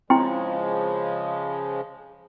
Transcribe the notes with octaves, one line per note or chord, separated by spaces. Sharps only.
C#3 F3 G#3 C4 E4 G5 C6